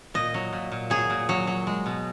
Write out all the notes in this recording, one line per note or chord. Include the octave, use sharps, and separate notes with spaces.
A#2 D#5
F#3
A#2
A#2
F#3 G#4
A#2
F#3
F#3
G#3
B2